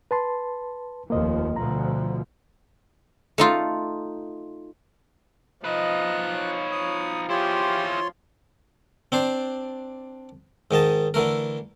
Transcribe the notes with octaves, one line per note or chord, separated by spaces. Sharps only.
B4 A5 C6
F1 D#2 F3 A#3 D#5
D2 B2 F3 A#5
A3 D#4 F4
F3 D#4 B4 D#5 F#6
C#5
F3 D#6
E4 F4 G4 G#4 C#5 C6
C4 D4 C5
G#2 D#3 D#5 A5
D3 E3 A3 A#4